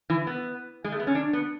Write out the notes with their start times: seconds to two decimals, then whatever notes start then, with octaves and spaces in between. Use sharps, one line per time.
0.10 E3
0.27 B3
0.84 G#3
0.92 A3
0.99 B3
1.07 C#4
1.15 D4
1.33 B3